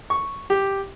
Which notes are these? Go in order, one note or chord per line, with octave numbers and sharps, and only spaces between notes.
C#6
G4